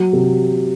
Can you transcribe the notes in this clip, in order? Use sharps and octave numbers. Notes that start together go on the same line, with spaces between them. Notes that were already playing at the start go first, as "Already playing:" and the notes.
Already playing: F#3
C3